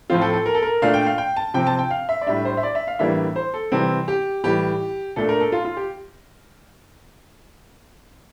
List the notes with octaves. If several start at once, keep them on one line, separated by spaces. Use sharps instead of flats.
A2 F3 C4 F4
A4
A4
A#4
A4
A#4
A#2 A3 D4 F5
G5
F5
G5
A5
C3 F3 C4 G5
A5
G5
F5
E5
D5
A2 G3 D4 E5
C5
E5
D5
E5
F5
A2 E3 G3 A#3 D4 E5
C5
A4
C3 E3 G3 C4
G4
A2 E3 G3 G4
A#2 A3 D4 A4
A#4
A4
F4
F4
G4